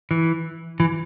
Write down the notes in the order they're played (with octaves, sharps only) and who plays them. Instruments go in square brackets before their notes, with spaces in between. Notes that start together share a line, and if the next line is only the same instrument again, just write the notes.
[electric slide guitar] E3
E3